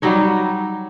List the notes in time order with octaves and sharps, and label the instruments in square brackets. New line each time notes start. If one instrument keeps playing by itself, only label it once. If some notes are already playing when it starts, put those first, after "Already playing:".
[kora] F#3 G3 D#4 C#5